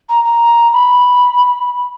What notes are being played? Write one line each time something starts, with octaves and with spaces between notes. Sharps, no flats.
A#5
A#5
B5